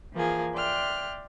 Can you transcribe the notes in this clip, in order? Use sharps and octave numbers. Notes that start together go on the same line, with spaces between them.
E3 F3 A#3 G#4
D5 E5 G5 C6 F6 F#6